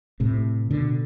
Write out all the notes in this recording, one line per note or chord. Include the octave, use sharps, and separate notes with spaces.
A2 C3
B2 D3